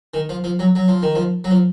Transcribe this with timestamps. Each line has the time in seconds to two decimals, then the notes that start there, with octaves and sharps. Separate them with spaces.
0.14 D#3
0.29 F3
0.44 F3
0.59 F#3
0.75 F#3
0.88 F3
1.02 D#3
1.15 F3
1.44 F#3
1.51 F3